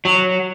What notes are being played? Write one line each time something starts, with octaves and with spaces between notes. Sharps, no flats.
F#3